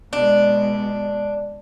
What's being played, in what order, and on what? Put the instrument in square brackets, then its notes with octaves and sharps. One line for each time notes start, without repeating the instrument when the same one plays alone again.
[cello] B2 G#3 [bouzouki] D4